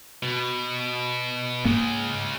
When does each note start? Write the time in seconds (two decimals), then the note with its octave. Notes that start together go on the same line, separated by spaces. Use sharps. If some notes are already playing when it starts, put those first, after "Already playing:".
0.23 B2
1.65 G#2 C#3 G#3 A#3